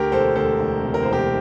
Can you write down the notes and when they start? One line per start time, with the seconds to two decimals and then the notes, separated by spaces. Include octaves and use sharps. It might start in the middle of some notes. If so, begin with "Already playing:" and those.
Already playing: D2 G4 A#4
0.12 E1 A4 C5
0.36 D2 A4 C5
0.59 E1
0.83 C3
0.94 A#4
1.03 E1 C5
1.11 G4 A#4